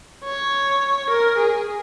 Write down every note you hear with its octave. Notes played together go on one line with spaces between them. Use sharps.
C#5
A#4
G#4